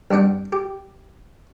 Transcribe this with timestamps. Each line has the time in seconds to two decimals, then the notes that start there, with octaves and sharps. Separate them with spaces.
0.11 C2 G2 D4 F#5 G5
0.52 G4